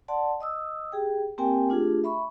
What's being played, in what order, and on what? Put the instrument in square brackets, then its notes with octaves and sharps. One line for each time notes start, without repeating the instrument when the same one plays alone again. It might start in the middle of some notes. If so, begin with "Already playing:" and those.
[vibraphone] D5 F#5 A5 C6
D#5 D#6 E6
G4 G#4 G5
A#3 C4 G4 A#4 G5 G#5
A3 D4 F4 G4 G#4
E5 B5 C#6